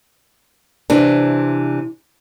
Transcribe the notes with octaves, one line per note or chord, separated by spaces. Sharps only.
C3 E3 D4